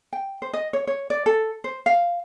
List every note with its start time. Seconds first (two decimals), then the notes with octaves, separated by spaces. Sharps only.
0.13 G5
0.42 C5
0.54 D#5
0.73 C#5
0.87 C#5
1.10 D5
1.26 A4
1.64 C5
1.86 F5